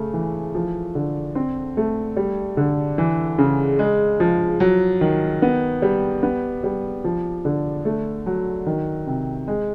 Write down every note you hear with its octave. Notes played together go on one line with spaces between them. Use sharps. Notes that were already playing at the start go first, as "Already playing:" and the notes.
Already playing: C#3 A3
E3
F3
D3
C4
A3
G3
D3
E3
C#3
G#3
F3
F#3
D#3
B3
G3
B3
G3
F3
D3
A3
F#3
D#3
C3
G#3